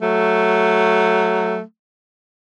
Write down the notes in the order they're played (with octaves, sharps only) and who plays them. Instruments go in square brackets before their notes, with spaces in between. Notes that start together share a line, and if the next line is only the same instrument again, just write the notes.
[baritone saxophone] F#3 [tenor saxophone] A3